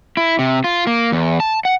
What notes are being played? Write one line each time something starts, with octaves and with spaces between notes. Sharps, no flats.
E4
C3
F4
A#3
E2
A5
F#5